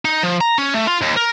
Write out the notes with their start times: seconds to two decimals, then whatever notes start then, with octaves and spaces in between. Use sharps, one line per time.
0.05 D#4
0.23 F3
0.41 A#5
0.58 C#4
0.74 A3
0.87 F4
1.01 D#2
1.16 A#4